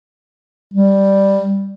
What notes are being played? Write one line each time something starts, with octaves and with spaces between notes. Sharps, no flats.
G3